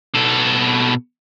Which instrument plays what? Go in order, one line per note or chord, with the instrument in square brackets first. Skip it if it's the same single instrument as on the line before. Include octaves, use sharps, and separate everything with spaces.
[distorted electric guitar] B2 A4